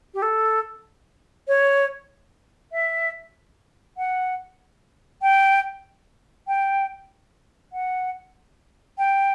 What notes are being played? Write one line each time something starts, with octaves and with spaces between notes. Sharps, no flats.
G4
A4
C#5
E5
F#5
G5
G5
F#5
G5